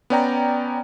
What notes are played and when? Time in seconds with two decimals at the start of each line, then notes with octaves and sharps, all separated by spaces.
0.10 B3 C#4 D5 G5 A#5